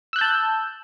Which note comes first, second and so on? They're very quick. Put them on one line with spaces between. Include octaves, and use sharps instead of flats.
E6 F#6 G6 A5